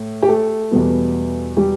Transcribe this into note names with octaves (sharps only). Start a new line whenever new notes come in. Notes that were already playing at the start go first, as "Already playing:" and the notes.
Already playing: A2
G4
A3 A4
E2 B2 G3 B3
G3 G4